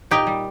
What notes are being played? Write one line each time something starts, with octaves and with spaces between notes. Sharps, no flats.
A#2 D#4 G4
G3